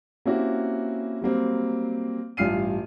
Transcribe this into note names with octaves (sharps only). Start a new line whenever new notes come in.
A#3 C4 C#4 E4 F#4 G4
F#3 G3 A#3 C4
A1 G2 F4 F6 C7 D#7